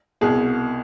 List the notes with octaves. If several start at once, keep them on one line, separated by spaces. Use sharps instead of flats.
C2 B2 G#4